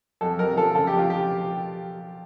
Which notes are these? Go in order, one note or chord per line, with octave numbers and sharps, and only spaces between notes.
F2 A4
F2 A#4
F3 A4
C#3 A4
G4
F2
F4
G4